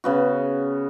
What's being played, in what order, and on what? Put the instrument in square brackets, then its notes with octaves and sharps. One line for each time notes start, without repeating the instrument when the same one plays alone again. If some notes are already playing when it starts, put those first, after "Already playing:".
[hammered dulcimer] C#3 B3 F#4